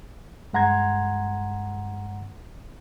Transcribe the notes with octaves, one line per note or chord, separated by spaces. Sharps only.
G2 G#3 F#5 A#5 C6 G#6